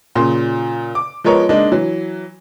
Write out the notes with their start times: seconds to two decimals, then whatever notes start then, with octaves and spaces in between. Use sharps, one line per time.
0.15 A#2 C#3 C6
0.95 D6
1.24 F3 G#3 B3 A#4 C#5
1.49 G#3 A#3 D4 D#4
1.71 E3 F#3